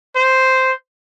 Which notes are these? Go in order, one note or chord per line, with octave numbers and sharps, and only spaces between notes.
C5